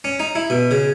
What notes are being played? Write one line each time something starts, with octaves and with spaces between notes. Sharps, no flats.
C#4
D#4
E4
B2
C#3